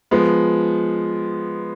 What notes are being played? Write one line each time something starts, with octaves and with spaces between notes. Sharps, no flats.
F3 G#3 B3